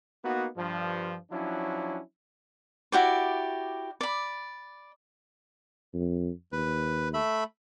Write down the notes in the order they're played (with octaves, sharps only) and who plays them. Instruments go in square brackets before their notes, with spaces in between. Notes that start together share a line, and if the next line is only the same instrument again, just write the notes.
[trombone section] A#3 B3 D#4 F#4
G2 F3
F3 F#3 C#4 D4 E4
[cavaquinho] E4 F#4 G4 D5
D5 B5
[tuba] F2
[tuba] D#2 [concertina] B4
[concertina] A3 E5 B5